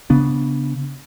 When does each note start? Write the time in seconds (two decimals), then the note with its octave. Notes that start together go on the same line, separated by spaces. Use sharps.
0.10 C#3 B3 D4